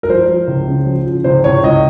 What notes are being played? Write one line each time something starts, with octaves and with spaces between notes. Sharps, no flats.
A#4
F3 C5
F3
C#2
C#3
F3
F3
C#2 C5
C#2 C#5
C#2 D#5